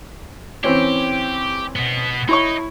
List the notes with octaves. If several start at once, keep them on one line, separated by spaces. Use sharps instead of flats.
E3 C4 C#4 G4
B2 B3
D#4 E4 C#5 C#6